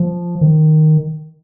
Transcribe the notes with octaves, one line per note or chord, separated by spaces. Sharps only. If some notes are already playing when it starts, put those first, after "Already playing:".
Already playing: F3
D#3